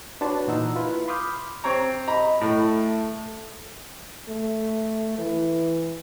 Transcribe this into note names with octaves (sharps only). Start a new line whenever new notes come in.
D4 F#4 B4 C#5 A5 C6
A#2 E3 D#4 F#5 A#5 E6
E4 F4 B4
B5 C6 D6 D#6 F6 G6
C4 C#5 A#5
D#5 A#5 B5
A2 A3
A3
E3